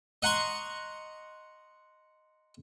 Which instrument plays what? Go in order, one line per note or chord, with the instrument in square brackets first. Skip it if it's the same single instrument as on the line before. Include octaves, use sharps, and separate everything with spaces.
[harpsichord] D#5 F#5 A#5 C6 C#6